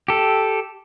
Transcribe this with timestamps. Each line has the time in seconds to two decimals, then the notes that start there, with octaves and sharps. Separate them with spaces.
0.08 G4 A4